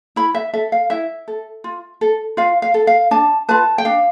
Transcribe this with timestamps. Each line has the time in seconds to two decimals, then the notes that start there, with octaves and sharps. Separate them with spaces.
0.16 E4 B5
0.35 E5
0.54 A4 E5
0.72 F5
0.90 E4 E5
1.28 A4
1.64 F4
2.01 A4
2.37 F4 F5
2.62 F5
2.74 A4
2.87 F5
3.11 D4 A5
3.49 F4 B4 A5
3.78 G5
3.85 D4 F5